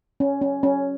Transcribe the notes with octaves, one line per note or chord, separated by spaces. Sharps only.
C#4
C#4
C#4